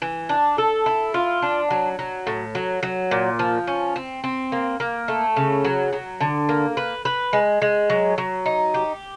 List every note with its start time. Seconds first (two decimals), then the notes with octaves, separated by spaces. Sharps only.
0.02 E3
0.29 D4
0.58 A4
0.86 E4
1.14 F4
1.42 D4
1.70 F#3
1.99 F#3
2.27 A2
2.55 F#3
2.83 F#3
3.11 A#2
3.39 F3
3.67 C#4
3.96 C4
4.24 C4
4.52 A#3
4.80 A#3
5.08 A3
5.36 C#3
5.65 F#3
5.93 F#3
6.20 D3
6.49 A#3
6.77 B4
7.05 B4
7.33 G#3
7.62 G#3
7.90 F#3
8.18 F#3
8.46 D#4
8.74 G4